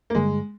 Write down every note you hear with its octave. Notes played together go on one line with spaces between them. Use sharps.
A#3
G2 D3 G3 G#3